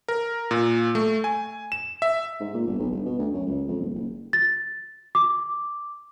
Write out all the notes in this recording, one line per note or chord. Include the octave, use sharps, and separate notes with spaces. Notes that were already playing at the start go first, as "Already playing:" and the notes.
A#4
A#2
A3
G#5
E7
E5
G#2
A#2
G1
B1
G1
B2
D2
F#2
C#2
F2
D#1
F#1
A6
D6